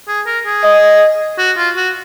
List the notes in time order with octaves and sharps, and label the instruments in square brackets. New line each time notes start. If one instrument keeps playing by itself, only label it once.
[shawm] G#4
A#4
G#4
[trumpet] D#5
[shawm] F#4
F4
F#4